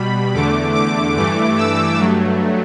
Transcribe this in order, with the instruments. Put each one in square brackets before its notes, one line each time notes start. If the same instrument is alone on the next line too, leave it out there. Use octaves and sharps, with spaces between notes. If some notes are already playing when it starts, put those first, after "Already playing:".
Already playing: [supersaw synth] B2 G3 B5
E2 D3 A3 D6
D6
G2 E3 A3 D6
E6
G2 F#3 A3